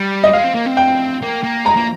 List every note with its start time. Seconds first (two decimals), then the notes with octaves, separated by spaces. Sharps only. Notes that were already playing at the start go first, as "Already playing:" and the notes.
Already playing: G3
0.24 D#5
0.33 G#3 F5
0.44 C4
0.55 A#3
0.66 C4
0.77 G5
1.22 A#3
1.43 A#3
1.65 G#3 A#5
1.76 A#3